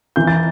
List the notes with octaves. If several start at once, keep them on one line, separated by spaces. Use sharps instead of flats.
E3 G6
A6